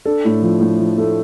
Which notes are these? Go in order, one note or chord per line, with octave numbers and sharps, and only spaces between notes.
D4 A4
A2
F3
A2
F3
A3